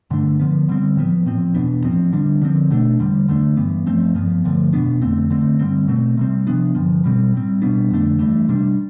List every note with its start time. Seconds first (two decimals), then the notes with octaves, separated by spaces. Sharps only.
0.10 G2 D3 A3 D4
0.40 D3 F3 B3
0.68 D3 G3 C4
0.97 A2 F3 B3
1.26 A2 F3 C4
1.54 E2 B2 B3 D4
1.84 A2 F3 C4
2.12 D3 G3 D4
2.42 D3 F3 C4
2.70 B2 A3 D4
2.99 E2 D3 G3
3.28 D3 A3 D4
3.57 G2 E3 B3
3.86 G2 F3 A3 C4
4.15 G2 F3 B3
4.44 G2 D3 F3 A3
4.73 E2 B2 B3 D4
5.01 F2 D3 A3 C4
5.30 D3 A3 C4
5.59 G2 D3 G3 C4
5.88 B2 A3 C4
6.17 C3 G3 C4
6.47 C3 F3 B3 D4
6.75 G2 D3 F3
7.04 B2 G3 C4
7.33 A2 G3 C4
7.62 B2 G3 B3 D4
7.91 F2 D3 A3 D4
8.19 G2 E3 A3
8.49 C3 G3 D4